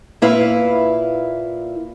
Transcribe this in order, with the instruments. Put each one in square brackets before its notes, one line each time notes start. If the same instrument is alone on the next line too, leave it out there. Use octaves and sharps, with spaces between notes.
[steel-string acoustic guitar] A#2 E4 B4 F5